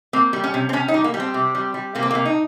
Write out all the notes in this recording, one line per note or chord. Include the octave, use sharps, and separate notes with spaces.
A#3 C4
G3
C#4
C3
C4
C3 C#4
D#4
G3
A#3
G3
C4
C3
G3
G3
C3 A#3
C4
C3 A#3
D#4